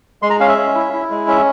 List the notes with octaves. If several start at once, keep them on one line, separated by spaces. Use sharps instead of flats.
G#3 C6
A#5
C#4 F5
E5
C#4
E4
E4
G#3
C#4 E5